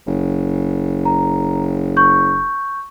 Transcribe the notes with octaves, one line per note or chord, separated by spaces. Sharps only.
F#1
A#5
C#6 G6